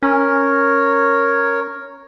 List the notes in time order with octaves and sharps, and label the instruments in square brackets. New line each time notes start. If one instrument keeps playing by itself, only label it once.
[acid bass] C#4 [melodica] A#4 C#5